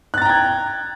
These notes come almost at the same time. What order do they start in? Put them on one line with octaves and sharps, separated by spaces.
F#6 A6 A#5 G5 G#6